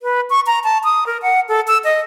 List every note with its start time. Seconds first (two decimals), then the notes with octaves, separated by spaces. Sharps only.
0.02 B4
0.30 C#6
0.47 A#5
0.64 A5
0.84 D#6
1.06 A#4
1.22 F#5
1.49 A4
1.68 E6
1.84 D#5